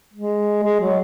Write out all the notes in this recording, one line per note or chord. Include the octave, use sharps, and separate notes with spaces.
G#3
G#3
F#3